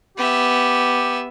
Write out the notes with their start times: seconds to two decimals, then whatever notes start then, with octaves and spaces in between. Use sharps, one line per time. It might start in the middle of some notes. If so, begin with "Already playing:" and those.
0.17 B3 G4 E5